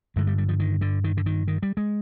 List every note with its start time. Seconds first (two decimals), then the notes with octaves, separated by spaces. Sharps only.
0.16 G2 D3 G#3
0.27 G3
0.38 G3
0.49 F3
0.59 D#3
0.81 D3
1.04 D#3
1.17 D3
1.26 D#3
1.48 D#3
1.63 G3
1.77 G#3